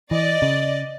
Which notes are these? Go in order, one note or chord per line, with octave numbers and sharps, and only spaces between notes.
E3 D5 D#5
C#3